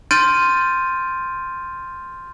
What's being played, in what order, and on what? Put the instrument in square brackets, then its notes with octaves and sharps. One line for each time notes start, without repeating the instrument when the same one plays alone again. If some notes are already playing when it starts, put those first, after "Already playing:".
[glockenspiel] C6 F6 G6 A6 D7 D#7